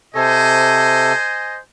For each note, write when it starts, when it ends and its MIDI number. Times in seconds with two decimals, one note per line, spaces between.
0.15 1.13 48
0.15 1.13 69
0.15 1.60 72
0.15 1.60 75
0.15 1.60 80